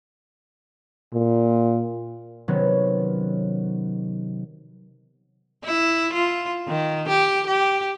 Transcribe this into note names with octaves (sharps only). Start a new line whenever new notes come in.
A#2
C3 D#3 F#3 B3 C#4
E4
F4
D#3
G4
G4